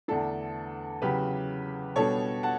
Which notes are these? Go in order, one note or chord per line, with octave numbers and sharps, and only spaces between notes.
E2 D3 A3 D4 A4
E2 C#3 F#3 C#4 G4 B4
B2 G3 B3 D4 A4 C#5
F#5 A5